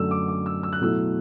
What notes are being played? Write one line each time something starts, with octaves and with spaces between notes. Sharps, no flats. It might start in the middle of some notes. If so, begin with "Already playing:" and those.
Already playing: F#2 D3 F#3 A3 E6
D6
D6
E6
E6
F#6
B2 F#3 A3 E4 E6